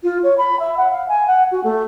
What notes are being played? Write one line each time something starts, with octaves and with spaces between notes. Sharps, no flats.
F4
C#5
B5
E5
F#5
F5
G#5
F#5
F#4
A3